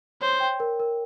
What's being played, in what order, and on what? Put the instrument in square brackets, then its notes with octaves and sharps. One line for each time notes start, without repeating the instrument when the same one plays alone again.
[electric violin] C5 [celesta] C#5
[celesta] G5
A#4
A#4